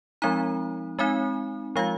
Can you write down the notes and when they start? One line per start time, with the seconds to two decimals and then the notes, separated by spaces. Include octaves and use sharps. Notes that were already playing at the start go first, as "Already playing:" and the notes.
0.22 F3 G#3 C4 D#4 A#5
0.99 G#3 C4 D#4 G#5
1.76 F3 G#3 F4 F5